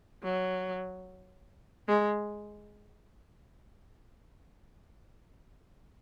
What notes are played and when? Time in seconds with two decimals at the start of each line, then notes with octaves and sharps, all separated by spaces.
0.23 F#3
1.88 G#3